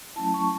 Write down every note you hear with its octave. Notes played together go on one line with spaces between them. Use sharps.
F#3 A3 C#4 E4 A5
C#6